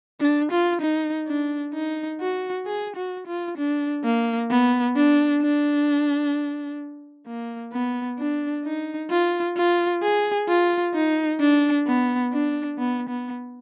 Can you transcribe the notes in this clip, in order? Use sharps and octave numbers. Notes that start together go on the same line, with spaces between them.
D4
F4
D#4
D4
D#4
F#4
G#4
F#4
F4
D4
A#3
B3
D4
D4
A#3
B3
D4
D#4
F4
F4
G#4
F4
D#4
D4
B3
D4
B3
B3